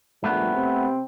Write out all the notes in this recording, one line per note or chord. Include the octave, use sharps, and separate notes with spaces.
A#1 G#2 G3 A3 B3
C3 C4